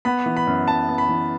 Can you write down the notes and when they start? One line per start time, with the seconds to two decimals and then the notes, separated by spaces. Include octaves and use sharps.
0.05 B3 B5
0.26 E3
0.37 B5
0.47 F#2
0.67 F#2 A5
0.88 B3
0.98 B5
1.09 E3